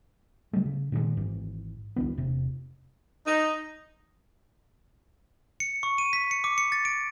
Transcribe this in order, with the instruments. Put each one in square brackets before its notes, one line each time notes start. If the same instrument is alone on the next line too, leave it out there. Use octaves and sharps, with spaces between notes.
[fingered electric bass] C#3 F#3 G3 A3
C#3
A#2 D#3 F3 G#3
G#1 G#2 E3
C2 D3 E3 B3
E1 C3
[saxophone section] D#4
[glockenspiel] C#7
C#6
D#7
B6
C#7
D6
C#7
A6
D7